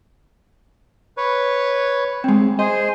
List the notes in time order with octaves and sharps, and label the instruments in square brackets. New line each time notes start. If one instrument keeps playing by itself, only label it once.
[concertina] B4 C#5
[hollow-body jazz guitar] G#3 C4
[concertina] G#4 C5 [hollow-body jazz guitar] D#5